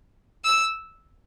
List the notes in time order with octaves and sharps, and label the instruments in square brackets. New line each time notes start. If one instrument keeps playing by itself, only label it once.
[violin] E6